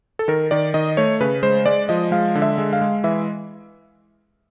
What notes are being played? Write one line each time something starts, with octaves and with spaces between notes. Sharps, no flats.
A4
D#3 A#4
D#3 D5
D#3 D#5
A3 C#5
C#3 B4
G#3 C5
G#3 D5
F3 D#5
G#3 F5
D3
E5
G#3
F5
G#3
E3 E5